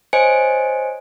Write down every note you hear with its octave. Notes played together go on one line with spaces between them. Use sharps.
C5 C#5 D#5 G#5 C#7 D7